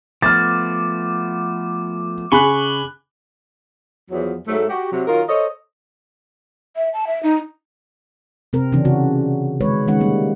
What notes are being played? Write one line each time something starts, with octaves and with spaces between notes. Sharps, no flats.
F3 A3 B3 D6 F6 A6
C#3 G#5 B5 C#6 F#6 F#7 G7
E2 F3 F#3
G#2 F#3 A3
F#4 G4
C3 F#3
D#3 F#3 F4 A#4
A4 C5 C#5 D#5
E5
A5
E5
D#4
C3 C4 A#4
C#3 E3 C#4 D4
C#3 F#4
D#3 G#3 B4 C#5
D#3 G#3 C#4 F#5
G3 A#3